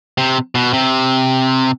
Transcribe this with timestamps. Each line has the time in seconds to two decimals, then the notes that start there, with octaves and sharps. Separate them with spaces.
0.18 C3
0.55 B2
0.73 C3